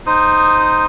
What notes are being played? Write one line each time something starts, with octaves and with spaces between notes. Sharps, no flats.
D#4 C5 D#6